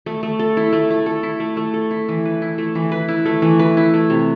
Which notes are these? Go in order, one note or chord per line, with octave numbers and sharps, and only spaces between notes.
A3
A3
A4
E4
A3
A3
A4
E4
A3
A3
A4
E4
E3
B4
E4
A3
E3
B4
E4
A3
E3
B4
E4
A3
C3